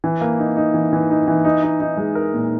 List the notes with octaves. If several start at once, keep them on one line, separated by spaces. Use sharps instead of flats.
E3
A#3
D#4
D#4
E3
E3
D#4
E3
D#4
D#4
D#4
G#3
A#4
A#2